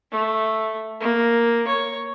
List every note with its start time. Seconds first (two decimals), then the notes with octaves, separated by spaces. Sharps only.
0.11 A3
1.00 A#3
1.68 C#5